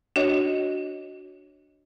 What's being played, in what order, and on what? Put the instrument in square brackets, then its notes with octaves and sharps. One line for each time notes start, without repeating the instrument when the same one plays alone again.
[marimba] D4 F#4 C#5 D#5